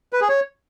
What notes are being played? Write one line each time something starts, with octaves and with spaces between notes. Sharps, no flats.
B4
G#4
C#5